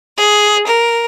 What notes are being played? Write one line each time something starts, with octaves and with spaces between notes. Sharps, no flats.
G#4
A#4